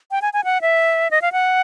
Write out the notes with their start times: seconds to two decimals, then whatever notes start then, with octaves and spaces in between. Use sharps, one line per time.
0.11 G5
0.22 G#5
0.33 G#5
0.44 F#5
0.61 E5
1.11 D#5
1.22 F5
1.32 F#5